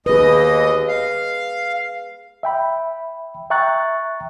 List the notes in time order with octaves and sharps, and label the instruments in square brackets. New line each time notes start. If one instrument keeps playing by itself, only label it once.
[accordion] D#2 D#5 [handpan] G#4 B4
[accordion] F5
[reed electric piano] E5 G5 B5
E5 G5 A#5 C#6 F#6 A6